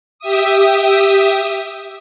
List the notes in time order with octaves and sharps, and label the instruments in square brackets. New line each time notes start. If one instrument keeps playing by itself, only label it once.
[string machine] G4 E5 D#6